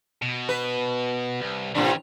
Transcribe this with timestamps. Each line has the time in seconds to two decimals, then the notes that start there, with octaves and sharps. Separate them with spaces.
0.22 B2
0.49 B4
1.40 C2
1.75 A2 C3 E3 C#4 D4